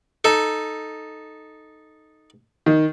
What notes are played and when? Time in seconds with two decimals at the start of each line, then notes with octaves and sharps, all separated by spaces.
0.24 D#4 A4
2.66 D#3